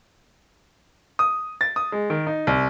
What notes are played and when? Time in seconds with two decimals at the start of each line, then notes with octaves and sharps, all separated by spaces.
1.19 D#6
1.61 A6
1.76 D#6
1.92 G#3
2.10 D#3
2.27 D#4
2.47 C2